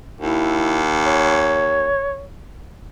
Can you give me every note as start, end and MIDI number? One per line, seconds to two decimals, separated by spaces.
0.21 1.90 39
0.21 0.81 64
1.05 2.24 73